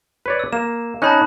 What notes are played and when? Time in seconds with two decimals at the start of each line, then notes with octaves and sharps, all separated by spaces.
0.26 B4 C#5 D5
0.39 E6
0.53 A#3 E7
1.02 C#4 D#4 A5 B5 F#6